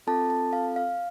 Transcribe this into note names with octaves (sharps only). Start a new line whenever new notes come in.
C4 F4 A4 A5
A5
F5
F5